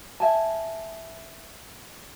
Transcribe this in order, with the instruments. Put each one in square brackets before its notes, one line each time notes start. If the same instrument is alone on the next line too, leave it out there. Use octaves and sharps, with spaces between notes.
[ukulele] E5 G#5 A5